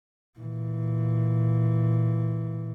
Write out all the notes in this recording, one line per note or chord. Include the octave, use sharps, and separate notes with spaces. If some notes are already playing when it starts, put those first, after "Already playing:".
A#2 E3